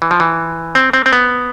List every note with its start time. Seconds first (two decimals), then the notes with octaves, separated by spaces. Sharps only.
0.02 E3
0.11 F3
0.20 E3
0.75 C4
0.93 C4
1.06 C4
1.13 B3